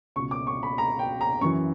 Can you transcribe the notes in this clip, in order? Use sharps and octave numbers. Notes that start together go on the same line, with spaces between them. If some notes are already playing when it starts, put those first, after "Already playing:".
C#2 B2 C#6
D6
C#6
B5
A#5
G5
A#5
F#2 E3 C#6